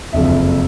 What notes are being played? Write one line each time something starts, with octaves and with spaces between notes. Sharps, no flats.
F#1 F2 D3 F3 E5